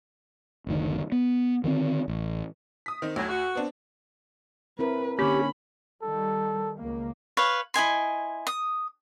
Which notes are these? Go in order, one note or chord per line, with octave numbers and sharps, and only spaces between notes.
F#1 D2 D#3
B3
D3 D#3 G#3 C4
A1
D#6 B6
D#3 C4 D#4
D2 A2 F#3
F#4
B3 C4 D4
C4 E4 A#4 B4
D3 A#3 C#4 G4 B5
D#3 G3 A4
C#2 A#3
B4 C#5 F5
E4 D#5 G#5 C6
D#6